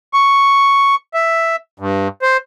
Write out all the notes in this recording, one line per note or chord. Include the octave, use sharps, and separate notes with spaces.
C#6
E5
G2
C5